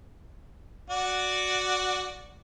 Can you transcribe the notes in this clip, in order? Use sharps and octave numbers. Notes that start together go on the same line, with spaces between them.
F#4 D5 F#5